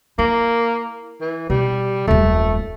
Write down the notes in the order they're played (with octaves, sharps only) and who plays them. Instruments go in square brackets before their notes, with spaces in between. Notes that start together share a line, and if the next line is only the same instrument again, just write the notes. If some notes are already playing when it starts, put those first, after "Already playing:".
[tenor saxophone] A#3 [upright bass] E4
[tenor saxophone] E3
[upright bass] B2 [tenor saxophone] G3
[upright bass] D#1 F#2 [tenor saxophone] A3